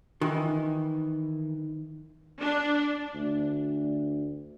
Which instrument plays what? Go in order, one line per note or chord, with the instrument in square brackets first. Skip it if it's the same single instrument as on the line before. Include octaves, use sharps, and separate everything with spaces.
[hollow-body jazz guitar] D#3 E3
[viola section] D4
[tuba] D2